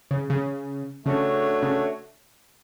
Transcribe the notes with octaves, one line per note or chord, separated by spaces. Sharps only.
C#3
C#3
C#3 A3 D4 F#4 C#5
C#3